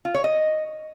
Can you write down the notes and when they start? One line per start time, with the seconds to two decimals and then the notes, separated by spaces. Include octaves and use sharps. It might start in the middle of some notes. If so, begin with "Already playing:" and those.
0.05 F4
0.14 C#5
0.24 D#5